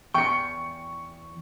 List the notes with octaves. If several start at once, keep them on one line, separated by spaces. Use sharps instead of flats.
E2 G5 C#6 C#7